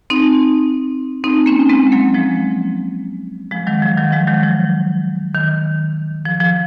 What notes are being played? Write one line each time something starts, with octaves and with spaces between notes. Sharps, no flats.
C4 D#4
C4 D#4
A#3 C#4
G#3 C4
F#3 A#3
F3 G#3
F3 G#3
D#3 F#3
F3
D#3 F#3
F3 G#3
D#3 F#3
F3
D#3
F3
F3